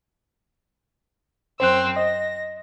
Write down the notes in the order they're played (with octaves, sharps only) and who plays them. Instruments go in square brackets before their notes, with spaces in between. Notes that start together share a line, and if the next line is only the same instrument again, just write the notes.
[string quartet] F#2 C4 E6 [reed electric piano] C5 F#6
[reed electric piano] D#5 [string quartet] A#6